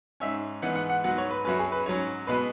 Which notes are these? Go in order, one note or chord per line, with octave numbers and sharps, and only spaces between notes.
G#2 G#3 C#4 E5
G#2 E3 G#3 B3 F#5
F#5
F#5
G#2 F#3 B3 F#5
C#5
B4
F#2 F#3 C#4 B4
G#4
B4
G#2 F#3 C#4 C#5
B2 G#3 B3 B4